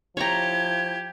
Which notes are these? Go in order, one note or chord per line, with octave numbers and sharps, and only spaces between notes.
F3 E4 G4 C#5 A#5 G#6